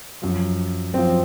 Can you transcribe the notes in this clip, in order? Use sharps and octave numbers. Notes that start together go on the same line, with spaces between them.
F#2 F3
F#2 F3 C4